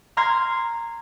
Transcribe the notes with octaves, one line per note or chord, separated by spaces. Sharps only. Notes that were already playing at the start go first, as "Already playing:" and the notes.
A#5 C6 F6 G#6 C7